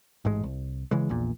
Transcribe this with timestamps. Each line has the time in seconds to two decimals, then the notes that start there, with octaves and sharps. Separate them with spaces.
0.25 A1 G#2 G#3
0.43 C2
0.91 C#3 E3 G#3
1.09 A#1 E2 A#2